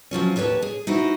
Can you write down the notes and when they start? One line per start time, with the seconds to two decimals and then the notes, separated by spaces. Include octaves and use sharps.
0.11 C3 F3 F#3 C#4
0.36 D#2 G4 B4 C#5 A5
0.62 G#4
0.87 D#4 E4 F#4 C5